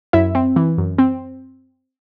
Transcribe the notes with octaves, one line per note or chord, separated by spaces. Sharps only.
F#2 E4 E5
C4
E3
F#2
C4